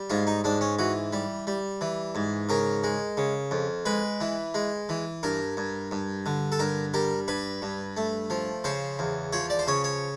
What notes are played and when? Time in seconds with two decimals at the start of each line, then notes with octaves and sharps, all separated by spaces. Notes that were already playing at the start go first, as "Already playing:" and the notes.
Already playing: G3
0.10 G#2 F4
0.27 D#4
0.44 G#2 D4
0.61 C#4
0.79 E3 F#4
1.13 G3
1.47 G3
1.81 E3
2.15 G#2
2.49 C#3 A#4
2.84 G#3
3.17 C#3
3.51 F2
3.85 G#3 B4
4.20 E3
4.54 G#3
4.89 E3
5.23 G2 A#4
5.57 G2
5.91 G2
6.26 D3
6.52 A4
6.59 G2 A#4
6.94 G3 A#4
7.28 G2 B4
7.62 G2
7.97 A3
8.30 F3
8.64 C#3 C5
8.99 E2
9.33 F3 C#5
9.50 D5
9.59 C5
9.67 C#3 C#5
9.84 C#5